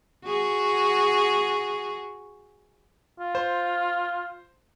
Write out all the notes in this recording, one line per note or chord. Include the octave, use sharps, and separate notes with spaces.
F#4 G#4
F4
C5